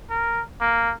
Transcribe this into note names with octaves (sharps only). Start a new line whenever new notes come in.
A#4
A#3